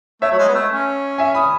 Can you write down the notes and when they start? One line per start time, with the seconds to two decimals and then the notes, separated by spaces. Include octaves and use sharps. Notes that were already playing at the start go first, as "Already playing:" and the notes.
0.22 A3 C#5 E5
0.32 F#3
0.39 G#3
0.48 B3
0.55 A3
0.71 C#4
1.18 E5 G#5
1.35 B5 D#6